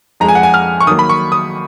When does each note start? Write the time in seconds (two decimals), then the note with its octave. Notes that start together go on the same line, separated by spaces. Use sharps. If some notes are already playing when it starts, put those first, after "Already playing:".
0.20 F2 F3 G#3 A#5
0.28 G#5
0.35 F#5
0.43 G#5
0.54 F6
0.81 C#6
0.87 D#3 F#3 A#3 D#6
0.99 B5
1.09 C#6
1.32 D#6